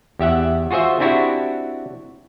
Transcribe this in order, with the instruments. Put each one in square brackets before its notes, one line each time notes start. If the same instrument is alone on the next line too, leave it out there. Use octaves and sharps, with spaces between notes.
[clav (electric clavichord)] E2 G4 E5 F#5
F4 F#4 G#4 C5 E5
C4 D4 E4 F#4 G4